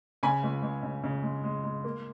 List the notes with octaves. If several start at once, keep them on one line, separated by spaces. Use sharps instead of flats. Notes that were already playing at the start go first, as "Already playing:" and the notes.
C#3 G#5 B5
C#2
C#2
C#3
C#3
G#3
G#3
G#3
A#3